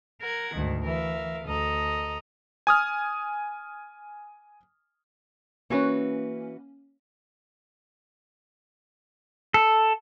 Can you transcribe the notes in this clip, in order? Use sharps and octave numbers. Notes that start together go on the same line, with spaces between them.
A#4 F#5 G#6
D2 G#2 D#3
E3 A#4 E5 F5
D2 A4 D#5 A#5
G#5 D#6 F6
E3 A#3 C#4 F#4 B4
A4